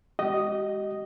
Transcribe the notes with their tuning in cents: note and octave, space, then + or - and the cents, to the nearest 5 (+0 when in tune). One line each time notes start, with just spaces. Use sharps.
G#3 -20 G4 -40 D#5 +0